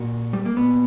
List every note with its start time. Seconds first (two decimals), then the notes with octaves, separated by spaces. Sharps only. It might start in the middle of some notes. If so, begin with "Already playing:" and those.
Already playing: A#2 F#4
0.33 G3
0.46 A#3
0.57 A#2 B3